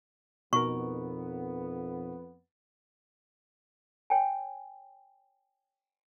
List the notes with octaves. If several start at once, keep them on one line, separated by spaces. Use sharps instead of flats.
F2 B2 B3 D#4 A#4 C#6
C#5 G5 G#5